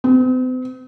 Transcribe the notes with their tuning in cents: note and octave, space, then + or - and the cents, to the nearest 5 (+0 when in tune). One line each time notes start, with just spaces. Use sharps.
C4 -45